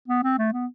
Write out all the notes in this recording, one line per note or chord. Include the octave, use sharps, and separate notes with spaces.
B3
C4
A3
B3